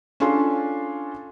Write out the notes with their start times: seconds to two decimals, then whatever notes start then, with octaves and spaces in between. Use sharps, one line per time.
0.20 C#4 D4 F4 A4 C6